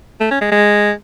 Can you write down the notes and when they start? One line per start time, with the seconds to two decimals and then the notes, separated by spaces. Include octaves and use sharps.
0.21 A3
0.31 C#4
0.41 G#3
0.52 G#3